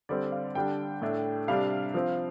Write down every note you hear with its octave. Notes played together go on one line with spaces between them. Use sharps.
D3 G3 C4 D5
F5
D3 G3 D4 G5
A2 A3 D4
C3 G3 D4 F5
F3 C4